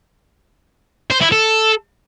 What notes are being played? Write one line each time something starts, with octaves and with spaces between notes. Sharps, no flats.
C5
E4
A4